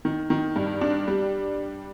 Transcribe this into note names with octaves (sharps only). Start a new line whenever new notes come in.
D#3
D#3
G2
D4
G3